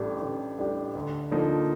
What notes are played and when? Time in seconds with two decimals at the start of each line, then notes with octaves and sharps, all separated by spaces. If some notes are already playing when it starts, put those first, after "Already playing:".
Already playing: A1 A2 G3 D4 G4
0.22 A1
0.59 A2 G3 D4 G4
0.95 D2
1.31 D3 F3 A#3 D#4